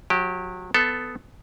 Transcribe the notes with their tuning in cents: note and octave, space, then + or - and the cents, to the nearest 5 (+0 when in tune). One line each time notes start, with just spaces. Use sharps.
F#3 -30 G4 -5
B3 +15 A4 +0